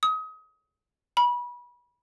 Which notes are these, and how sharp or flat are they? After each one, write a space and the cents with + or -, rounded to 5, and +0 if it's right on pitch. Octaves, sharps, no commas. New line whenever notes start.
D#6 +30
B5 -25